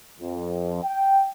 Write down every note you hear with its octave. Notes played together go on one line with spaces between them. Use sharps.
F2
G5